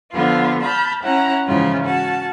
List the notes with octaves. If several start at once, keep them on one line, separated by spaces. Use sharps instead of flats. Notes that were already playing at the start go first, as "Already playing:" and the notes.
D3 F3 B3 F4
A5 B5 F6 G6
C#4 E4 F#5 A#5
G#2 C#3 E3 F3 E4 F4
C#4 F#4 A5